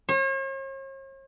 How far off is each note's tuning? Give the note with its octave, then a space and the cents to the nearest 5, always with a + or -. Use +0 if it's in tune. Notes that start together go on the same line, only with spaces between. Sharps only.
C#5 -45